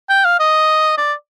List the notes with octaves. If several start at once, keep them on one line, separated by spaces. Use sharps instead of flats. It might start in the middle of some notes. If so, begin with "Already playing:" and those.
G5
F5
D#5
D5